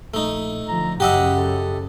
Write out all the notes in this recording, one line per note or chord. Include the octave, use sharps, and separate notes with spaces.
A#1 A3 D#4
D3 F3 A#5
F#2 C#3 G4 D#5 E5 F#5
A4